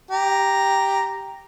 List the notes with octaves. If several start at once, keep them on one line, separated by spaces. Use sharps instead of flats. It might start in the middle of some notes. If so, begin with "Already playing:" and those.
G4 A#5